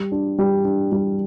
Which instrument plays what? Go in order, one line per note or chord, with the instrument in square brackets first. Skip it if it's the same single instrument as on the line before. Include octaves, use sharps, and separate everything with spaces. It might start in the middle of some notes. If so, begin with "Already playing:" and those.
Already playing: [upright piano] G3
D4
G3
D4
G3